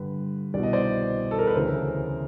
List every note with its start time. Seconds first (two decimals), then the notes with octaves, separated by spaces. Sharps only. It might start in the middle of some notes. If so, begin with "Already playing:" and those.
Already playing: G2 D3 B4
0.54 C2 B2 D5
0.63 D#5
0.73 C5 D5
1.31 A4
1.39 A#4
1.47 B4
1.54 D2 C#3 E3 A#4 C5